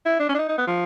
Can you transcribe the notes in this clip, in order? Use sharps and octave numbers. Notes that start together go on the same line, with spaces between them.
E4
D4
C#4
D4
D#4
D#4
B3
F3